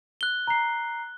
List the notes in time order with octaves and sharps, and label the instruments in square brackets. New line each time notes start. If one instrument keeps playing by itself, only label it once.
[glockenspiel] F#6 G7
[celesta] A#5 C7